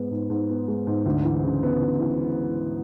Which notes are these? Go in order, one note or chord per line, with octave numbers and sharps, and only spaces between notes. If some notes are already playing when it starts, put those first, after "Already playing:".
Already playing: G#2 G#3 B3
G#2
G#2
B3
G#3
G#2
D2
E3
C#3
B3
D2
E3